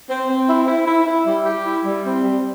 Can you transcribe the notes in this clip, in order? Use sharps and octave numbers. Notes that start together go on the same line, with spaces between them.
C4
C4
E4
E4
E4
E4
G3
G4
E4
G3
C4
G3